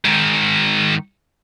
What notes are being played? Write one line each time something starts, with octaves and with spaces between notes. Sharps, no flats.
G#2 D#3